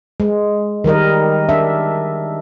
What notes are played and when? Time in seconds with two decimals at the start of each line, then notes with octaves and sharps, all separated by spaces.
0.20 G#3
0.84 D#3 G3 A#4 D#5
1.49 D4 E5